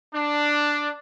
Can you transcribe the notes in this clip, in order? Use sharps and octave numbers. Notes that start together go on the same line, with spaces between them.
D4